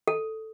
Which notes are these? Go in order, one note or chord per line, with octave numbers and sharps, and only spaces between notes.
A4